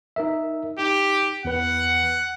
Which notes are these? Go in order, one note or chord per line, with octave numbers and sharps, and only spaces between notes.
D#4 A#4 E5
D#4 G4
E2 B4 F#5